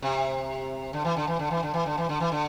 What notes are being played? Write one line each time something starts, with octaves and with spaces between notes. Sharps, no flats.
C3
D3
E3
D3
E3
D3
E3
D3
E3
D3
E3
D3
E3
D3